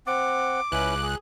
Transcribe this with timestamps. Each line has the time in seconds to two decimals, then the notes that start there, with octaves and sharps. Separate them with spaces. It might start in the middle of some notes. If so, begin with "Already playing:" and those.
0.07 C4 F#5 D6
0.72 C#2 C#4 E4 B4 F#6
1.02 G#4